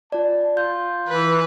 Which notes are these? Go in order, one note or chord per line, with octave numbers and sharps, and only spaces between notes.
F4 D5 A5
F4 G6
E3 B4